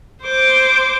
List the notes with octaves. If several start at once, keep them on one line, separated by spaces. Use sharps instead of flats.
C5 D6